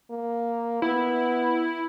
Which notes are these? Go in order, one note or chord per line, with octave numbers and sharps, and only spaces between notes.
A#3
B3 E4